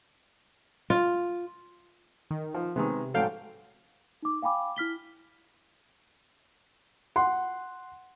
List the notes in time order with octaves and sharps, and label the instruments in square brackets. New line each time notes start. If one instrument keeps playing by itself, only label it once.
[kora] F4
[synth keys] D#3
[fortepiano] F3
[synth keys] C3 [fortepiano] D#3 G#3 B3
[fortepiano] G#2 F#3 [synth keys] A4 F5 G5
[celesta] D#4 D6
F5 G5 G#5 B5 D6
E4 F6 B6 G7
[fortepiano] F#5 C6